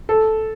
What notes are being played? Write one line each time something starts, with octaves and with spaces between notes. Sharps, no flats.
A4